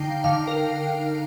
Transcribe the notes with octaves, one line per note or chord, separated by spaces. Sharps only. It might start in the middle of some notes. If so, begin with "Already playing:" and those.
Already playing: D3 D#4 F5 G5
D3 F5
A#4